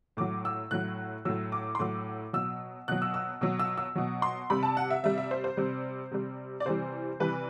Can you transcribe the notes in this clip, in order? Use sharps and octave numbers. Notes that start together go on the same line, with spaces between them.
A2 F#3 D6
E6
A2 F#3 F#6
A2 F#3 E6
D6
C6
A2 F#3 D6
B2 F#3 E6
B2 F#3 F#6
E6
E6
B2 F#3 E6
E6
E6
B2 F#3
C6
C3 G3 B5
A5
F#5
E5
C3 G3 E5
E5
C5
C5
C3 G3
C3 G3
D5
C3 E3 G3 C5
C3 E3 G3 B4